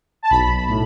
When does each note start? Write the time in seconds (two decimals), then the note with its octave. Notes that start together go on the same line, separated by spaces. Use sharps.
0.23 A5
0.30 B1 B5
0.69 A2